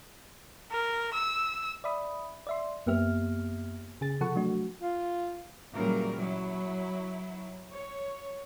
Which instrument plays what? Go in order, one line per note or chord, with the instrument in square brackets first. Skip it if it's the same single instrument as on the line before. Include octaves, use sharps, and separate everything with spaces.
[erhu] A#4
E6
[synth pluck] D5 E5 B5 D#6
D5 E5 C6
F#2 A#3 B3 G4 E5 F6
C#3 G#4 A6
C3 F3 A4 F#5 C#6
F#3 A3 D4 F#4
[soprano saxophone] F4
[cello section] A#2 C#3 E3 F#3 G3 A#4
F#3 E4
C#5